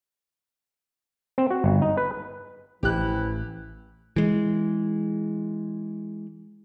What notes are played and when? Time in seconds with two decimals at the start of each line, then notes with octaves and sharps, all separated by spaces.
1.38 C4
1.51 F#4
1.64 G1
1.82 D#4
1.97 B4
2.83 A1 E3 F3 E4 G4 F#6
4.16 E3 G#3